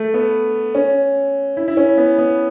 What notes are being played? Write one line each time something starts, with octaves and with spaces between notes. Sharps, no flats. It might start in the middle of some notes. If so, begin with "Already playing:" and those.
Already playing: A3
B3
C#4
E4
E4
C#4
B3
B3